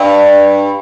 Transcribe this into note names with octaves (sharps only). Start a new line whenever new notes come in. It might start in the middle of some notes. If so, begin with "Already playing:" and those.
Already playing: G2